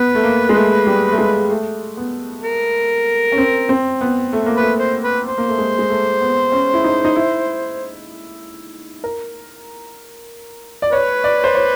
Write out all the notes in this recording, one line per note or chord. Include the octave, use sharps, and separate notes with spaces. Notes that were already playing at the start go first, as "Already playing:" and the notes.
Already playing: B3 B4
A3
A#3
G#3
A3
G3
A3
G#3
A3
B3
A#4
C#4
C4
C4
B3
A3
A#3
A3 B4
C5
B4
C5
A#3
A3
G#3
G#3
A3
B3
C#4
E4
D#4
D#4
E4
A#4
D5
B4 C#5
D5
C5
C#5